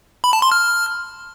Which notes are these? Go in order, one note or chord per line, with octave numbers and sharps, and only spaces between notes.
B5
A5
C6
F6